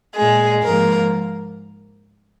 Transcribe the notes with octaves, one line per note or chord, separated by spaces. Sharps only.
A#2 G#3 G#4
G#2 F3 A#3 A#4